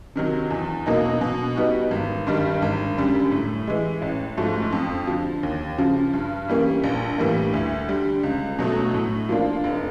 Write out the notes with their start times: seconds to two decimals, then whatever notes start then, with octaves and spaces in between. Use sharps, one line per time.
0.16 C3 D#3 F#3
0.50 E2
0.86 B2 F#3 A#3 D#4
1.21 B2
1.56 G3 B3 D#4 F#4
1.91 G#1
2.27 G2 D#3 G3
2.62 G#1
2.97 F#2 D3 G3
3.31 A2
3.67 E3 G#3
4.02 A1
4.37 G#2 F3 A3
4.72 F2
5.07 D3 F3
5.43 D#2
5.78 C#3 F3
6.13 G2
6.48 E3 G3 A#3 C#4
6.84 A#1
7.18 A2 E3 G3 A#3
7.54 D2
7.89 D3 G3
8.23 C#2
8.59 B2 F#3 A3
8.94 A2
9.29 F3 A#3 D4 F4
9.64 F1